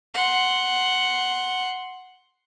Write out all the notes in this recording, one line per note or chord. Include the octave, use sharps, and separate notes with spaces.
F#5 C6